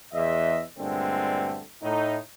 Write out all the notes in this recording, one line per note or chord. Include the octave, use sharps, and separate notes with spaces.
E2 D#5 E5
G2 A#2 D3 G#3 A3 C4
A2 D#4